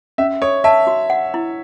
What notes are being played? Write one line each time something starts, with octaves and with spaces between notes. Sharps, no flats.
C#4 E5
A4 C#5
E5 A5
F#4
F#5
E4